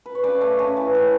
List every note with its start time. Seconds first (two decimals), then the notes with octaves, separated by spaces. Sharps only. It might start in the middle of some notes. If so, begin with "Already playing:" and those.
0.06 B4
0.15 C#5
0.24 C#3 B4 D5
0.41 A3
0.59 C#3
0.77 E3
0.95 A2